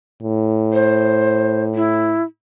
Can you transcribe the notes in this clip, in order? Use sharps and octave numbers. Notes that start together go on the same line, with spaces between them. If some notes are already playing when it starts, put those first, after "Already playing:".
A2
C5
E4